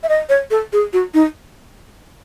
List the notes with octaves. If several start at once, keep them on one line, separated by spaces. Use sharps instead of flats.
E5
D#5
C#5
A4
G#4
F#4
D#4